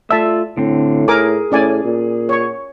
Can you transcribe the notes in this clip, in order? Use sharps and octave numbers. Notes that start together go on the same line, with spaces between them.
A3 F4 D5 E5 A5 E6
A2 D3 C4
G#4 A#4 G#5 D6
A2 C#4 D5 G#5
A#2
C#5 C#6